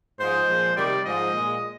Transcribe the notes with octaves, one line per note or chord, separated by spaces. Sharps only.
G#2 F3 G#3 C5
A#2 F3 G#3
C3 D#3 G3 D5
G#2 F3 G#3 D#5
A#2 G#3